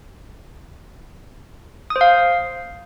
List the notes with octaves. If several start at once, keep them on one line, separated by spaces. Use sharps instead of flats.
D#6
C5
F5